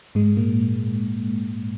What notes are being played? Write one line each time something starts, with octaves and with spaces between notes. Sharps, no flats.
G#2 G#3
A#2 A#3